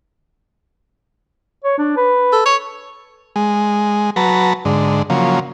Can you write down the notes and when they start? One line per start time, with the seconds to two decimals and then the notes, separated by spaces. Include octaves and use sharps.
1.64 C#5
1.78 D4
1.97 B4
2.33 A4
2.46 C#5
3.36 G#3
4.16 F#3 B4 A5 A#5
4.65 G#2 D3
5.10 C#3 F3 F#3 A#3